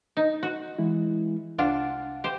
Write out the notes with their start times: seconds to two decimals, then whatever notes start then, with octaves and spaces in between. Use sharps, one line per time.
0.17 D#4
0.43 F#4
0.78 E3 G#3 E4
1.58 C2 D4 F4 F5 F#5
2.24 G4 C5